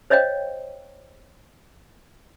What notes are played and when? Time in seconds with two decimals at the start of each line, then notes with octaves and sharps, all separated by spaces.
0.10 C5 C#5 D#5 F5 G5